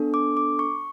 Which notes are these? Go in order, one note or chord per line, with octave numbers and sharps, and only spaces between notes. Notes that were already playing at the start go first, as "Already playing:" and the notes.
Already playing: B3 D4 A4
D6
D6
C#6